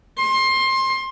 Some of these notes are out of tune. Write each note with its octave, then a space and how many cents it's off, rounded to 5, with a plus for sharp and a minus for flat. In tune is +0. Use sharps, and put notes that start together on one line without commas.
C6 +25